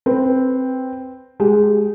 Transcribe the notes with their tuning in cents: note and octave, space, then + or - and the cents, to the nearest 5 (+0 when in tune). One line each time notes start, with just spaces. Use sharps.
C4 +0 B4 +5
G#3 +5 G4 -15